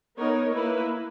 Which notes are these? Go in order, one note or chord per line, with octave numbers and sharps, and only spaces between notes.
B3 D#4 A#4 C#5
A#3 E4 B4